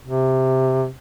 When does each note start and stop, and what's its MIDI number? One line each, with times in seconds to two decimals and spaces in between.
0.04 0.90 48